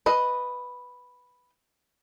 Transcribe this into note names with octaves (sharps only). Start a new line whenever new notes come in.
B4 D#5